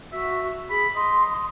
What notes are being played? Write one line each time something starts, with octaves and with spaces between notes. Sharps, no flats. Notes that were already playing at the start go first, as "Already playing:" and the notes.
F#4 E5
G#4 B5
D#5 C6